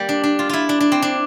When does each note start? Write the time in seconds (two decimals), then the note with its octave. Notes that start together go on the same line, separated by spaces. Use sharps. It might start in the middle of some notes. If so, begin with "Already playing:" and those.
Already playing: G3 A#3
0.09 D4
0.23 D4
0.39 F4
0.49 E4 F4
0.69 D4
0.80 D4
0.92 C4
1.02 D4